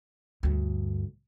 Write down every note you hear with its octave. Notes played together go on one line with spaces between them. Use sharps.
D2 G2